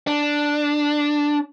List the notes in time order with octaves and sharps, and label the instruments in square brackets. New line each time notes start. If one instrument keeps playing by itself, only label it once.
[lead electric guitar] D4